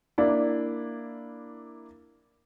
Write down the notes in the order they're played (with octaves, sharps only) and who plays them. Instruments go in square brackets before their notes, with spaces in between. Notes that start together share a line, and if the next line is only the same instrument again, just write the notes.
[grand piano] A#3 D4 E4